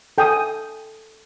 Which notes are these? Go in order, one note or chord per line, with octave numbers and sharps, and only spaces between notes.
A4 G5 G#5 D#6